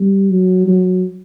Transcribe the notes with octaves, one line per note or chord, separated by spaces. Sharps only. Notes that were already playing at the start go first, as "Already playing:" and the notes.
Already playing: G3
F#3
F#3